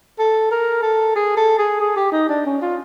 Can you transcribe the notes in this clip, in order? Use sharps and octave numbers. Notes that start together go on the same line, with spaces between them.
A4
A#4
A4
G#4
A4
G#4
G#4
G4
D#4
D4
C#4
F4